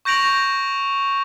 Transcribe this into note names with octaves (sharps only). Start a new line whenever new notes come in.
C#6 G6 A#6 D7 F7 F#7